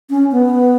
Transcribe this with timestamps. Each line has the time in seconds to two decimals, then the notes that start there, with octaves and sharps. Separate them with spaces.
0.10 C#4
0.32 B3